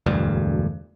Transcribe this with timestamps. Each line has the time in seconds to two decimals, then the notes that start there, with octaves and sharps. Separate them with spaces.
0.06 E1 D2 G2